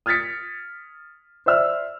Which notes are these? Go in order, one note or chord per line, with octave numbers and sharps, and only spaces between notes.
D#6 F6 G#6 A6 B6 C#7
C5 D5 E5 E6 F6